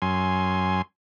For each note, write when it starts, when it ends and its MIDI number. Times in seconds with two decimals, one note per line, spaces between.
0.02 0.82 42
0.02 0.82 80
0.02 0.82 84